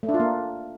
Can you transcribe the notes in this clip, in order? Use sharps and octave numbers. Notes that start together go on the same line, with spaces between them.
A3
D4
F4
A#3